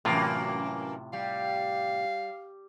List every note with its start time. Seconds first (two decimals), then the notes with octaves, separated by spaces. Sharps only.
0.05 F#2 A2 C3 E3 A#3 F4
1.13 G3 F5